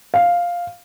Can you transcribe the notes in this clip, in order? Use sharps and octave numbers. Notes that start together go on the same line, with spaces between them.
F5